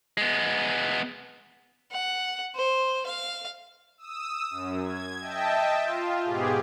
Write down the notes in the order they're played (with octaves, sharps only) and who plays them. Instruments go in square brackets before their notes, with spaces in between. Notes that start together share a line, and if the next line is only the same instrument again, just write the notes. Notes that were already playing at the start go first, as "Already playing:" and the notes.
[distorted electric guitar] G#3 B3
[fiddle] F#5
C5
F5
[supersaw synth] D#6 E6
F#2
G#6
D#5 E5 G5 A5
F4
G#2 B2 G4 G#4